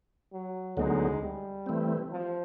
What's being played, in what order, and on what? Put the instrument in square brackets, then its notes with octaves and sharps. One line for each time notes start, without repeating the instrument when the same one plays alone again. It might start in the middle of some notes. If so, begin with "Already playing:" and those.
[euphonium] F#3
[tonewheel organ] D2 D3 F#3 B3 D#4 [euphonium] G#3
[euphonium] G3
[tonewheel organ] E3 A3 C4
[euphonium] F3